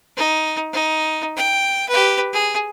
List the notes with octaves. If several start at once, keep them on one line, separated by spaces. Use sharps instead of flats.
D#4
D#4
G5
G4 B4
G#4